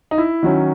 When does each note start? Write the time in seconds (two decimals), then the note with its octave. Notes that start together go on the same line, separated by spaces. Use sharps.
0.11 D#4
0.18 E4
0.43 D#3 F#3 C#4